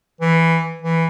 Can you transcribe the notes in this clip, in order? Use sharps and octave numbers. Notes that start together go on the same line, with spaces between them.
E3
E3